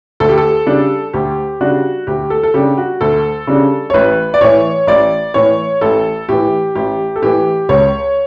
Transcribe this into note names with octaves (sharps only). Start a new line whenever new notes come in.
D2 A4
G4
A4
C#3 G3 D4
D2 G4
C#3 G3 D4 F#4
D2 G4
A4
A4
C#3 G3 D4 G4
F#4
D2 A4
C#3 G3 D4
C#5
A1 B4
D5
A2 E3 C#5
A1 D5
A2 E3 C#5
A1 A4
A2 E3 G4
A1 G4
A4
A2 E3 G4
C#2 C#5